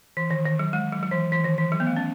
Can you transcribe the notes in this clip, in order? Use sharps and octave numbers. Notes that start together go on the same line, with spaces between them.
E3
D#3
D#3
F#3
G#3
F#3
F#3
E3
E3
D#3
E3
F#3
B3
A3
C#4